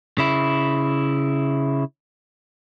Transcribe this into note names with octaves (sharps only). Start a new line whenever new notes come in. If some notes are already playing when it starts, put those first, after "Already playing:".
C#3 E4